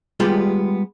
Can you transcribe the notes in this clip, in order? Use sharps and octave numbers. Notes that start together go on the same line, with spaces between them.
G3 G#3 B3 F4 G4